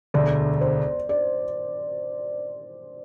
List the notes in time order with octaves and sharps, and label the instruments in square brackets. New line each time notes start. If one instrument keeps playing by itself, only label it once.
[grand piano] E1 D2 D3 [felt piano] D5
[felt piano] C5
D5